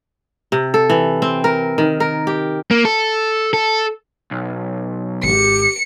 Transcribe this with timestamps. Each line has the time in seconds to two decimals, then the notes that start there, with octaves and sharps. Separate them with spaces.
0.52 C3
0.74 A4
0.90 E3
1.22 C4
1.44 A#4
1.78 D#3
2.00 A#4
2.27 G4
2.71 A#3
2.85 A4
3.53 A4
4.31 B1
5.23 G#1 G4 C#7